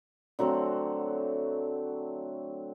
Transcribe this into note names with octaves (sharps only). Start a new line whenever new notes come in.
D3 F#3 A3 C4